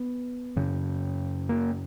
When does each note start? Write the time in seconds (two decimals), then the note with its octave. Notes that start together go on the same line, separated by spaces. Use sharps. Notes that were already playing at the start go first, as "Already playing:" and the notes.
Already playing: B3
0.56 F#2 C#3
1.49 A#3